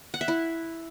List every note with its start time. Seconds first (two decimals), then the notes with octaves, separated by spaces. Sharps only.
0.14 F#5
0.21 E5
0.28 E4